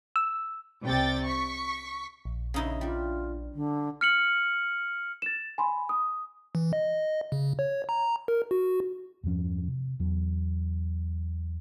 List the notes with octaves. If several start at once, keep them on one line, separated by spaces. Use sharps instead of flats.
E6
C2 C3 D5 G5 A6
C#6 B6
A#1
C#3 D#4 E4
G3 D4 F4
D3
F6 C#7 F#7
A6 E7
G#5 B5 C6
D#6
E3
D#5
C#3
C#5
A#5
A#4
F#4
E2 G2 F3 C#4
C3
E2 F#3